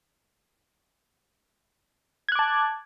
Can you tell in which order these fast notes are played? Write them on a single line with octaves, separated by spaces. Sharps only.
G#6 F#6 D6 A5